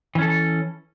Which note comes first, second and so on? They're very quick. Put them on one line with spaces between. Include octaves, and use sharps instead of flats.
E3 C#4 A4